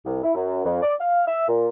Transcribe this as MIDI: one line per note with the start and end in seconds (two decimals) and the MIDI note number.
0.05 0.23 36
0.24 0.33 64
0.35 0.60 42
0.65 0.79 41
0.82 0.93 74
0.99 1.22 77
1.27 1.46 76
1.48 1.68 46